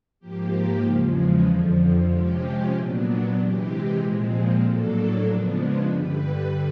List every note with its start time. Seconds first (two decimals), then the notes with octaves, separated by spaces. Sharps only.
0.20 G#2 F3 A#3 G4
0.83 E2 C#3 F3 G#3
1.46 F2 D3 F3
2.09 C3 F3 G#3 C#4 G4
2.73 A#2 F#3 B3 D4
3.36 C3 E3 G#3 G4
3.99 A#2 F3 G#3 C4
4.61 A2 F#3 A#3 D4 A4
5.24 C#3 F3 G#3 B3 D4
5.88 G2 D3 G3 B4